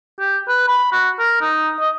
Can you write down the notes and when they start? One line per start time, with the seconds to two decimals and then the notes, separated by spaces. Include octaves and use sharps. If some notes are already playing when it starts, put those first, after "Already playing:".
0.19 G4
0.48 B4
0.68 B5
0.92 F#4
1.19 A#4
1.41 D#4
1.80 D#5